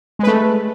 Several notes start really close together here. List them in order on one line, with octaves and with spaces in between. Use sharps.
G#3 B4 A3